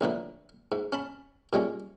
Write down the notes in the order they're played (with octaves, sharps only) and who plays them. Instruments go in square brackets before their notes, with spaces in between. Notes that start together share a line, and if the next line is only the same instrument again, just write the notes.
[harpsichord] A#1 A2 D3 B4
G#2
C#4 A5 B5
A#2 G3 G#3 C#4